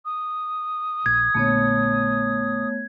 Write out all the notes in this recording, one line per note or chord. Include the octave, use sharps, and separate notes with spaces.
D#6
A#1 G#6
A#1 A#2 D3 A3 B3 C#5